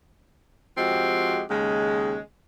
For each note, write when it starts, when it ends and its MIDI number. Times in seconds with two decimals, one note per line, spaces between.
0.77 1.42 53
0.77 1.42 56
0.77 1.42 60
0.77 1.42 66
0.77 1.42 67
1.50 2.20 39
1.50 2.20 49
1.50 2.20 56